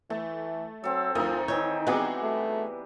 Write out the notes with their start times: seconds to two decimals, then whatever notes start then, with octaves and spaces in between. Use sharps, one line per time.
0.10 E3 A3 A5
0.84 F#3 C4 A4
1.15 D2 F3 D#4 F4 A#4
1.48 D#3 E3 D#4 C#5 G6
1.87 E3 G3 G#3 B3 C4 D#4 F#4 G#4
2.23 A3